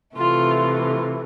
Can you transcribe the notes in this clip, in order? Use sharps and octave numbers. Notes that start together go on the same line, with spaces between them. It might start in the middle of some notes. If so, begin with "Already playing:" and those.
C3 E3 A3 F4
F4